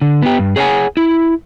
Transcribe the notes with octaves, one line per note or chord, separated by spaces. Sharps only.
D3
B3 G4
G2
G#4 C#5 F5 F#5 G#5
E4